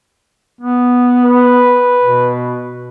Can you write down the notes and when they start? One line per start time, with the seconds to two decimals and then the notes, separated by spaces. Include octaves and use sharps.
0.61 B3
1.25 B4
2.03 B2